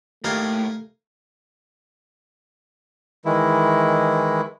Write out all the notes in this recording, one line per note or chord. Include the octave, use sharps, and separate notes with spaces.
A2 A3 A#3 D#4 G4 A#4 F5 G#5
D#3 E3 G#3 E4